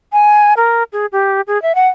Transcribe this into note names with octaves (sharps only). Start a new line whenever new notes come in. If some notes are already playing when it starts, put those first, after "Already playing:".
G#5
A#4
G#4
G4
G#4
E5
F#5